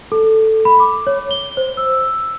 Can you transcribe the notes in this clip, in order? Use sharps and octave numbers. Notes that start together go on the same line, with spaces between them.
A4
B5
D6
C#5
G7
C5
E6